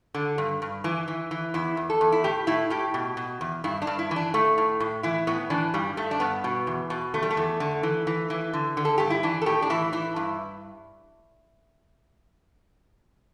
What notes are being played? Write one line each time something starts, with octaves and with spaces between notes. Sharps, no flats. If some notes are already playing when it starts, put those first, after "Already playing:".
D3
G2
G2
E3
E3
E3
E2 E4
E2
A4
E2
E4
A2 G4
A2 E4
A2 G4
B2
B2
E2
G2 E4
D4
G2
E4
E3
D4
A2 A3
A2
A2
E3 E4
A2 B3
E3 D4
G2 G3
G2 A3
D4
G2 B3
B2
E2
B2
E2 A3
G3
A3
E2
D3
E3
E3
E3
D3
D3
A4
G2 G4
E4
E3 D4
A4
A2 G4
D4
E3 E4
E3 E4
G2